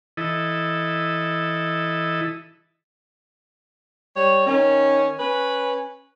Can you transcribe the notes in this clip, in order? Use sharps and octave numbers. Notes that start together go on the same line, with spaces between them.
E3 E4 A4 D#5
G3 C#5
D#3 C#4
C#4 B4